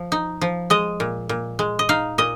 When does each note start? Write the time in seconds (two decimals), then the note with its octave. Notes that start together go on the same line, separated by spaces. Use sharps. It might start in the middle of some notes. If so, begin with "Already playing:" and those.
Already playing: F3
0.12 D#4
0.41 F3
0.70 G#3 D#5
1.00 A#2
1.29 A#2
1.59 G#3
1.79 D#5
1.89 D#4 F5
2.18 A#2 D#5